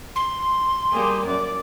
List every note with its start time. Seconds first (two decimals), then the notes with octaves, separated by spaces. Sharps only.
0.16 C6
0.92 G3 A#3 G#4
1.26 F#2 D5